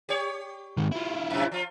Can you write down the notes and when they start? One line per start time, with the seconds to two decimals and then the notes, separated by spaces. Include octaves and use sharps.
0.09 G4 C#5
0.77 G#2 D#3
0.92 E4 F4
1.31 F2 C3
1.52 F3 F4